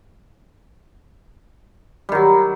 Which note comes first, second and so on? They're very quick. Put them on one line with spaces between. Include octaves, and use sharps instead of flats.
G3 D#3 F#3